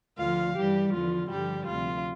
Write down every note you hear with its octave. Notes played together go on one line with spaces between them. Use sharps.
D2 D3 F3 F4 F5
G2 E3 G3 G4
E2 D3 F3 F4
G2 D3 F3 G3 G4
D2 C3 F3 F4